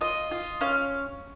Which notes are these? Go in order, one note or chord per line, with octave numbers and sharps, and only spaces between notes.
F4 D#5
F4
C#4 F5